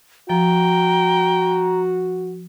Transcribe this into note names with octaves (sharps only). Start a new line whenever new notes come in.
F3 F#4 G5 A#5